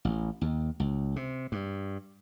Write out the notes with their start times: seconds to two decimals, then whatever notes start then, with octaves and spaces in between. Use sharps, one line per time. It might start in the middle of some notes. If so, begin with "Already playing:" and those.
0.05 A1
0.41 D#2
0.80 C#2
1.16 C3
1.52 G2